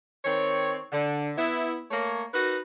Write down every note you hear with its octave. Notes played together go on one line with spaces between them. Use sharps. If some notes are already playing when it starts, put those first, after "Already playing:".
D#3 C4 C#5
D3
B3 E4
A3 A#3 C#5
D#4 F#4 A#4 B4